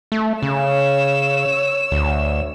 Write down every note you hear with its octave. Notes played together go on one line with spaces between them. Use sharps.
A3
C#3 C#5 E6
D2